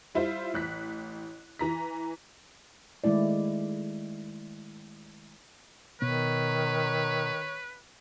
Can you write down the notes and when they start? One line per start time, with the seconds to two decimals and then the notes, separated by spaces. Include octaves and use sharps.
0.15 G3 E4 F4 C5
0.54 A1 F#6 B6
1.59 E3 A#5 B6
3.04 D#3 G#3 A3 E4 D5
6.02 B2 D#3 B3 B4 C#5